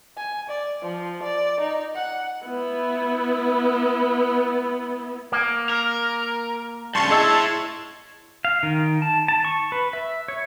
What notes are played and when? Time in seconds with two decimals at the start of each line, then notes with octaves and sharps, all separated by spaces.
0.18 G#5
0.49 D5
0.82 F3
1.23 D5
1.60 D#4
1.96 F#5
2.46 B3 E4
5.32 A#3
5.69 A#4
6.95 G2 C#3 A5 C6 C#6
7.10 E4 G#4 C#5 D#5 E6
8.45 F5
8.63 D#3
9.02 A5
9.28 A5
9.45 C#6
9.72 B4
9.93 E5
10.28 C#5